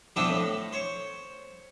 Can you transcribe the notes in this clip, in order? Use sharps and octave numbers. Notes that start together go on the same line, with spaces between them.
E3 F3 B3 C4 D4 E4
A2
C5 C#5